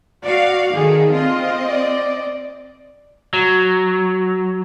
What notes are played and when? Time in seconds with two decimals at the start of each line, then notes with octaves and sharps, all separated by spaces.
0.23 F#4 D5 F5
0.74 D#3 G#4 A4
1.12 C4 F4 D#5
1.68 D5
3.33 F#3